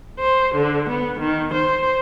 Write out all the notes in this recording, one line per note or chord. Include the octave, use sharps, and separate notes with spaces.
C5
D3
B3
D#3
C5